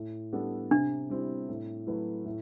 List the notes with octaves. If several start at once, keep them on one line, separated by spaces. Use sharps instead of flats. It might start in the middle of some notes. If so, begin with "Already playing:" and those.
Already playing: A2
G3 B3 D4 A4
C3 D4
G3 C4 E4
A2
F#3 A3 E4 B4
A2